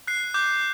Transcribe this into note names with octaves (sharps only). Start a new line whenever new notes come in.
F#6 C7
D6 G6